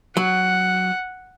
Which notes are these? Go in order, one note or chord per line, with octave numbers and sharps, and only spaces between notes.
F#3 F#5